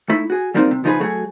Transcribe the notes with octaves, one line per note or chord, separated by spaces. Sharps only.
A3 D#4 E4
F#4 G#4
F#3 G3 A#3 C4 D#4 C5
C3
C#3 F3 D#4 F#4 G#4 B4
F#3 A3 F#4 G#4